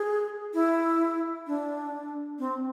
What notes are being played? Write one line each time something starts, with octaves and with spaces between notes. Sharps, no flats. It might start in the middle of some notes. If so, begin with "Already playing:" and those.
Already playing: G#4
E4
D4
C4